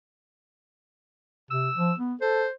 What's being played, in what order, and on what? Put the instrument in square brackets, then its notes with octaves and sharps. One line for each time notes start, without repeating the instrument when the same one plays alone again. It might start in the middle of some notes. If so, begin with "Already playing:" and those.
[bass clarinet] C3 [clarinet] E6
[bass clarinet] F3
B3
[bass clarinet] A4 [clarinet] C5